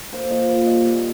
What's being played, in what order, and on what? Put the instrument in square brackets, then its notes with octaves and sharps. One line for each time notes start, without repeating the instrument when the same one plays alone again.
[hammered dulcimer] A#3 C5
A#2 D#5
A#2 C5
G3 D#5
A#3